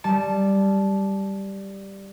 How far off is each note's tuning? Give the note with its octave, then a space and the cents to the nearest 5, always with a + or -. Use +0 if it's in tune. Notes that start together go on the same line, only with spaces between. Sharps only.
G3 +0 A5 -20